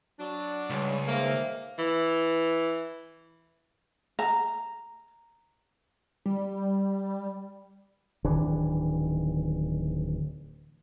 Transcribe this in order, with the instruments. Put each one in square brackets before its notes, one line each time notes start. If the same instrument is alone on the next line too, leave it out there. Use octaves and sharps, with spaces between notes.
[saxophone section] F#3 D4
[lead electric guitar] C#2 [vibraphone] G3 C#5
[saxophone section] D#3 G#3 A#3 [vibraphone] C5 E5
[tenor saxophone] E3
[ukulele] A#5
[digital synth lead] G3
[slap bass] D1 D#3 E3 D4